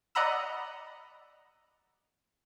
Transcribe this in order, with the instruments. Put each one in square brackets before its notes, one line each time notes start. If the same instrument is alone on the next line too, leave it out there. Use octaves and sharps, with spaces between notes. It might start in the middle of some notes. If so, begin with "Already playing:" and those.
[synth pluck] D5 D#5 F#5 A#5 B5 E6